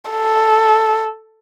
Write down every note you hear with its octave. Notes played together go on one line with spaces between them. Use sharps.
A4